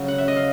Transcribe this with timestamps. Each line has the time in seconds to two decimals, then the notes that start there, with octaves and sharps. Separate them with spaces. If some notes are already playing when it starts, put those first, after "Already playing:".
Already playing: C#3 F#3
0.08 F#5
0.18 E5
0.28 D#5
0.36 F5